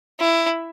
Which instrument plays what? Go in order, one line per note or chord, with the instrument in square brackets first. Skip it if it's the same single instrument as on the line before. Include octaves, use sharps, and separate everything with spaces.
[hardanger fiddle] E4